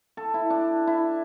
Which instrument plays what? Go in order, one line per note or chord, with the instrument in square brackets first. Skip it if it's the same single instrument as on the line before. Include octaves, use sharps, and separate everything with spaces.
[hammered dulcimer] A4
E4
D4
E4